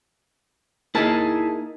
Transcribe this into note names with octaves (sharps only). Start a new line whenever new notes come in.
A#3 D#4 E4 G#4 A5